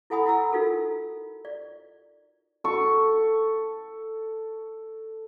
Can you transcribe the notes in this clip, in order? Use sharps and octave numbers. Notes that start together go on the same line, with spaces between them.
E4 A4 F#5 G#5 B5 D#6
E4 F#5 A#5 E6
D#4 F4 F#4 A4 A#4
D5
A4 C#6